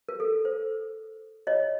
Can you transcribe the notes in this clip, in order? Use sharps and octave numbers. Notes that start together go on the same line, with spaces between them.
A#4
A4
C5
C#5 D#5